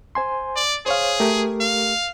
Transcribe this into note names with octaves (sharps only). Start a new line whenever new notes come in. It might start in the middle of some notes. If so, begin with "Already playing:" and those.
C5 G#5 C6
D5
G#4 C5 C#5 F5
A3 G4 A#4
F5